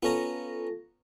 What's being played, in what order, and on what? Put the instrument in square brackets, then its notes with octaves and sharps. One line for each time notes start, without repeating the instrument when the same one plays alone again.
[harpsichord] B3 C#4 A#5 [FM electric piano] F4 A4 A#6